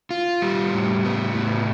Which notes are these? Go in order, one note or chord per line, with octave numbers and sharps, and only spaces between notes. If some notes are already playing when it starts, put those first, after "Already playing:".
F4
G3
A2
B3
A2